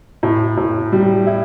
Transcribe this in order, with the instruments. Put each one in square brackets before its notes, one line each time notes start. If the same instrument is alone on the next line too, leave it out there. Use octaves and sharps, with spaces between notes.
[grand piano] A2
A2
G3
E4